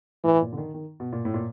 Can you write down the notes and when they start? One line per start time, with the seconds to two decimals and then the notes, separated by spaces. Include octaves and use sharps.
0.24 A2 E3
0.41 A#2
0.52 D3
0.57 D#3
0.74 D#3
1.00 B2
1.13 A#2
1.25 A2
1.34 A#2